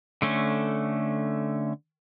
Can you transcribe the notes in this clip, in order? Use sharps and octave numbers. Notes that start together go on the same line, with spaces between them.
D3 A3 C#4